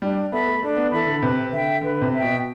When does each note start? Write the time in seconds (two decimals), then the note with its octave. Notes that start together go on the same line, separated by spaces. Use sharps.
0.01 G3 D4
0.31 B3 A4 E5 B5
0.47 A3
0.61 A3 D4
0.77 B3
0.92 E3 A4 E5 B5
1.07 D3
1.22 C3 B4
1.52 D3 E5 G5
1.81 D3 B4
2.01 C3
2.12 E5
2.17 B2 G5